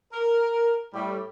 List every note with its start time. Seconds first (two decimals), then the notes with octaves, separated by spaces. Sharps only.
0.12 A#4
0.93 A2 G3